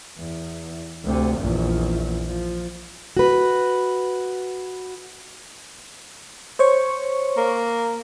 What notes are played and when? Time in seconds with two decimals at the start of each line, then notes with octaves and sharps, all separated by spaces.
0.18 E2
1.04 D2 C3
1.39 A#1 E2
2.27 F3
3.17 F#4 B4
6.59 C5 C#5 C#6
7.37 A#3